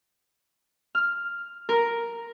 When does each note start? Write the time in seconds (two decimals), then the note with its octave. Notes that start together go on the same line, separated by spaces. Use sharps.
0.95 F6
1.69 A#4